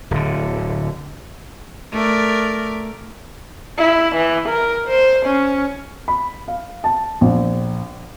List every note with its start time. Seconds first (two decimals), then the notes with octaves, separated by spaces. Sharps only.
0.11 D1 D3
1.92 A3 A#4 D5
3.78 E4
4.15 E3
4.48 A#4
4.88 C5
5.26 C#4
6.08 B5
6.48 F5
6.84 A5
7.21 A#1